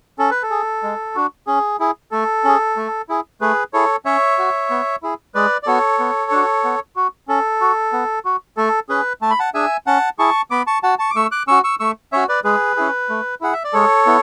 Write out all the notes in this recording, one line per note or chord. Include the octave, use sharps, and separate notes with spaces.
C#4 A4
B4
A4
G#4
G#3
D4 F#4
C#4 G#4
E4 G#4
A3 A4
C#4 G#4
A3
E4 G#4
A3 G#4 B4
E4 G#4 A4 C#5
C#4 C#5 E5
F#4
B3
E4 G#4
G#3 B4 D5
D5
B3 F#4 A4 C#5
B3
D4 F#4
B3
F#4
C#4 A4
F#4
B3
F#4
A3 A4
C#4 G#4 B4
A3 A5
B5
F#5 A5
D4 G#4 E5 G#5
C#4 F#5 A5
E4 G#4 A5 C#6
B3 B5 D6
A5 C#6
F#4 F#5 A5
A5 C#6
D6
A3 C#6 E6
D6 F#6
C#4 F#4 C#6 E6
C#6 E6
A3 C#6 E6
C#4 F#4 C#5 E5
B4 D5
G#3 G#4 B4
C#4 E4 G#4
A3
E4 G#4 F#5
E5
D5
G#3 A4 C#5
B3 E4